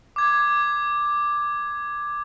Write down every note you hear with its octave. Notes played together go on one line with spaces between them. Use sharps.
D6 G#6